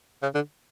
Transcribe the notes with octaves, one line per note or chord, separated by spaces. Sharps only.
C#3
D3